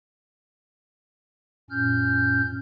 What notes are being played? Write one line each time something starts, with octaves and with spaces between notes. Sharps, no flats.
F#2 A#2 C#4 F6 G6